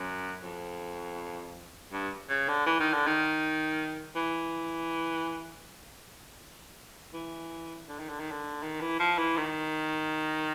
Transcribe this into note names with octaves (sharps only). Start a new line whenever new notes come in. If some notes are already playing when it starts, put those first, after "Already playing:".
Already playing: F#2
F2
G2
C#3
D3
E3
D#3
D3
D#3
E3
E3
D3
D#3
D3
D#3
D3
D#3
E3
F3
E3
D#3